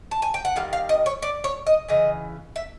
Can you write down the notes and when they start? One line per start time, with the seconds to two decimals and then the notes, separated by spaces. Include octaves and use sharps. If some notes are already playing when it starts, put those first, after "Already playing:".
0.11 A5
0.22 G#5
0.34 G5
0.45 F#5
0.56 D#3 G3 F5
0.73 F5
0.89 D#5
1.06 C#5
1.22 D5
1.44 C#5
1.67 D#5
1.88 C#3 E3 D#5
2.56 E5